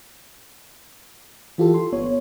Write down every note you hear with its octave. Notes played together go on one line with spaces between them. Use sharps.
E3 F4 G4 A4
C6
G1 B3 C#5